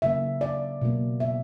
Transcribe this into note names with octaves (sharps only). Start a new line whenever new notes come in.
C#3 F#3 A#3 E5
D5
B2 F#3 A#3
E5